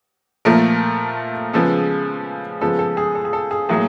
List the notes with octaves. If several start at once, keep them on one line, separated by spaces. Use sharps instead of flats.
A#2 F3 A3 A#4
C#3 F3 G#3 B3 A4
C#3 F3 G#3 B3 A4
A4
G#4
A4
G#4
A4
G#4
A2 F#3 A#3 G#4